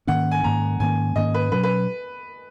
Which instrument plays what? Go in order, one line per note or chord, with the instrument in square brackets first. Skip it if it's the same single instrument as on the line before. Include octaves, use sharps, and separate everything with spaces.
[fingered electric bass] G#2 D#3 A#3 C#4 [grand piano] F#5
[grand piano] G#5
[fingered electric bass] G#2 D#3 A#3 C#4 [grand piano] A#5
[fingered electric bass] G#2 D#3 A#3 C#4 [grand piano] G#5
[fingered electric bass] G#2 D#3 A#3 C#4 [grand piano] D#5
[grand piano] B4
[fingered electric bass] B2 F#3 C#4 [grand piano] B4
[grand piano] B4